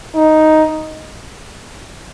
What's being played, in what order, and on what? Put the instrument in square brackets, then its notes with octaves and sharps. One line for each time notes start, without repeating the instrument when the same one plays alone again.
[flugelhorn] D#4